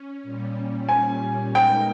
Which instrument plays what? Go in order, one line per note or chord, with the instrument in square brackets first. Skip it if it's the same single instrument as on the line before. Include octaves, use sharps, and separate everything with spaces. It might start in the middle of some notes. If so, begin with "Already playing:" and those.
Already playing: [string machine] C#4
A#2 G3 C#4
[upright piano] G#5
[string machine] G#3 B3 D#4 A#4 [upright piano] G5